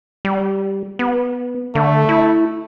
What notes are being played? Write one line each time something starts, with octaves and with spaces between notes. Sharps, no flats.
G3
B3
D3 A3
E4